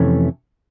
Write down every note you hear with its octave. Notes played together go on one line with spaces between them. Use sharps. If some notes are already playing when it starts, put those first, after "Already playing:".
Already playing: F2 C3 E3 A3 C#4